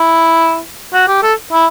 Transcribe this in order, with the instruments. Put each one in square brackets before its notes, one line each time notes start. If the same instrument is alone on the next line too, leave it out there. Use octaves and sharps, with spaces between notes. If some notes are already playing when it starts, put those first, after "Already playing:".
Already playing: [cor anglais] E4
F#4
G4
A4
E4